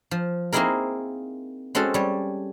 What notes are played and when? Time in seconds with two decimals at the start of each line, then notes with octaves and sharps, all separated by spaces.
0.11 F3
0.53 A#3 C4 D#4 E4 G#4 A#4
1.75 G#3 C4 C#4 F#4 A4
1.94 G3 C#5